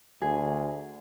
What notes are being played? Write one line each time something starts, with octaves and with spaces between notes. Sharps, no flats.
D2 G#4